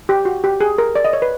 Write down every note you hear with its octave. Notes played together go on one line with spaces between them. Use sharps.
G4
F#4
G4
G#4
A#4
D5
D#5
C#5
B4